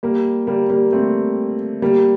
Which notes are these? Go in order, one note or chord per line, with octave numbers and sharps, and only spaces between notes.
G3 A#3
G3 A#3
G3 A#3
A3 C4
G3 A#3